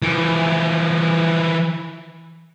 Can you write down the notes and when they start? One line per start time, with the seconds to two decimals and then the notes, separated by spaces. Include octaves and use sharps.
0.02 E3 F3